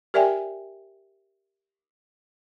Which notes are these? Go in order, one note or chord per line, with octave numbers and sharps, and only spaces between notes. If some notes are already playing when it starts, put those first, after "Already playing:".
G4 A#4 D5 E5 G5 G#5